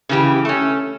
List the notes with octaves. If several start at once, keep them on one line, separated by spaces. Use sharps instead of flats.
C#3 E3 G4
A3 C#4